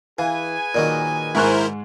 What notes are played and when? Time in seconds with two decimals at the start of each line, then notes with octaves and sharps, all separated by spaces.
0.19 E3 G#4 B4 F5 G#5
0.75 A#2 D#3 F#3 D5 D#5
1.35 G#2 E4 A#4 C5 C#6 F#6